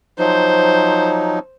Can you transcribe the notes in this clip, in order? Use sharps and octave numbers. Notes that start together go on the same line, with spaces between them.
F3 F#3 D#4 C5